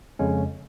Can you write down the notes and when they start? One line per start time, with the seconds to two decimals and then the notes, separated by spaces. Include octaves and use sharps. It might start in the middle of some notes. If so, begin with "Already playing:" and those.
0.19 F2 C#3 G#3 C#4